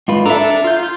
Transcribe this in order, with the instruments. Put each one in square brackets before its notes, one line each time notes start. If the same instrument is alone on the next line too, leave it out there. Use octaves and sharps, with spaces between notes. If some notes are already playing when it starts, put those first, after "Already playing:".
[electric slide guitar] G#2 F4 B4
[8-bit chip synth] D4 A4 [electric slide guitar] E5 A#5
[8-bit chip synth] F4 G6